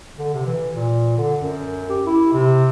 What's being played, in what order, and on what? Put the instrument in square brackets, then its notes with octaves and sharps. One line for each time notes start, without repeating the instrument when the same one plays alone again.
[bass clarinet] D3
C3
E3
A#2
D3
F#2
G4
E4
C3